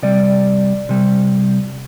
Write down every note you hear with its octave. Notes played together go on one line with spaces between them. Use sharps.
C3 G3 D5
C3 G3